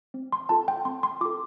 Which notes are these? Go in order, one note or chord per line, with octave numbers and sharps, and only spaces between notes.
C4
C6
F4 A4 A5
G5
C4 C6
C6
F4 A4 D6